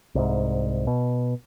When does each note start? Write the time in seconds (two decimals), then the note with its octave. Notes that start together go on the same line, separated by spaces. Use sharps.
0.15 C2 G#2
0.87 B2